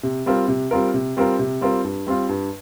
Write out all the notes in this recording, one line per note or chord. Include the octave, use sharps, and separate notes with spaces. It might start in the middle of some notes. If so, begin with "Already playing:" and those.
C3
G3 C4 F4 A#4
C3
G3 C4 F4 A#4
C3
G3 C4 F4 A#4
C3
G3 C4 F4 A#4
G2
G3 C4 F4
G2